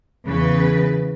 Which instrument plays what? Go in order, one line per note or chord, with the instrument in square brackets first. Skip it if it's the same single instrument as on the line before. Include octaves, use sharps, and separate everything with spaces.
[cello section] E2 C#3 B4